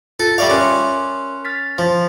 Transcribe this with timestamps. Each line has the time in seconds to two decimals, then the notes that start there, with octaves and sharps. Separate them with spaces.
0.20 F4 A4
0.38 G3 D5 E5 F5 C#6 D6
0.50 C#4 A#4 C6 F#6
1.45 F6 A6 B6
1.78 F3